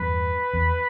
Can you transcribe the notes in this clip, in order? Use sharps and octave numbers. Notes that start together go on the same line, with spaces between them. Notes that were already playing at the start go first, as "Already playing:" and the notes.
Already playing: E2 G2 B4
E2